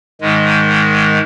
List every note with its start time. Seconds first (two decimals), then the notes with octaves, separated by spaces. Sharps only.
0.21 G#2 D#3 G#3